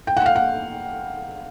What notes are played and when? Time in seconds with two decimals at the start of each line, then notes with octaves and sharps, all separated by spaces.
0.07 G5
0.17 F#5
0.26 F5
0.36 F#5